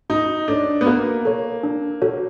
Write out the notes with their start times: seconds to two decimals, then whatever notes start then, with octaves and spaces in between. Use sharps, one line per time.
0.10 D#4 F#4
0.48 D4 A4 C#5
0.81 B3
0.86 A#3 F#4
1.25 A4 C#5
1.63 D4
2.02 F#4 A4 C#5